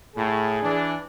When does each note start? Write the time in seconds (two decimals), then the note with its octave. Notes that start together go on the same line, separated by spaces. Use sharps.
0.16 A2 G#4
0.62 E3 D4